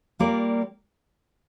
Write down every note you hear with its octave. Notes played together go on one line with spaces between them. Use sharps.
G3 A#3 F4 A#4 D5